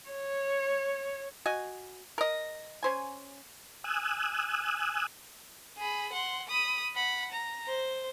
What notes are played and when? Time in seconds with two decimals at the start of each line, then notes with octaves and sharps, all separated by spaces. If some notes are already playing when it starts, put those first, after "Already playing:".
0.10 C#5
1.46 F#4 D#5 G#5
2.18 A#4 D#5
2.83 C#4 C5 G#5
3.84 G#5 D#6 E6 F#6
5.78 G#4 B5
6.13 F#5 C6
6.48 B5 D#6
6.95 F#5 B5
7.32 A#5
7.68 C5